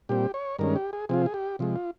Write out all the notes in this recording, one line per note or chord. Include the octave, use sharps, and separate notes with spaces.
A#2 G3 C4 G4
C#5
G2 D#3 G#3 C#4 A#4
G4
G#4
C3 F3 C4 F4 G#4
G#4
G4
C3 F3 G#3
F4